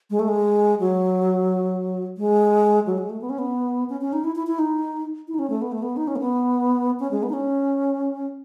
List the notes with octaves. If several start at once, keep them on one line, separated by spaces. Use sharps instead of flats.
G#3
A3
G#3
F#3
G#3
F#3
G#3
A3
B3
C#4
B3
C#4
C#4
D#4
E4
E4
E4
D#4
E4
D#4
C#4
A3
B3
A3
B3
D#4
C#4
A3
B3
C#4
G#3
B3
D#4
C#4